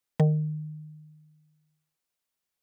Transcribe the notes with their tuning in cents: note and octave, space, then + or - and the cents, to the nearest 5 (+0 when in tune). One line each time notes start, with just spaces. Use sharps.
D#3 -25